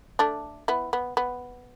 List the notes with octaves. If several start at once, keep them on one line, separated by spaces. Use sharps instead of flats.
A3 D4
B3 E4
B3
B3